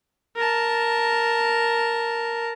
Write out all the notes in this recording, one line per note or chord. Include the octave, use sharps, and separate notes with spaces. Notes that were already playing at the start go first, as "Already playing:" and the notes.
A#4 A5